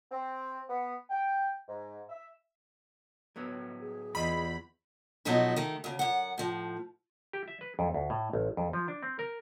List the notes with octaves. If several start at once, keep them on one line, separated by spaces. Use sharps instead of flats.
C4
B3
G5
G#2
E5
A2 F#3 B3
G#4
E2 F4 D#5 B5
B2 F3 F#3 A3 D#4 E4
D#3 A3
D2 C#3
F#2 F#5
A2 F3
G4
E5
B4
F2
D2
A2
A1
F2
F3
D4
C4
A#4